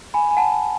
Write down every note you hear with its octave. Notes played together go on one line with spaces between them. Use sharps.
G#5 B5
G#5
F#5 A5